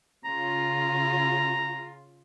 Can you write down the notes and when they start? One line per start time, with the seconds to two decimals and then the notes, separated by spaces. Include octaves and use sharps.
0.25 C#3 F4 A#5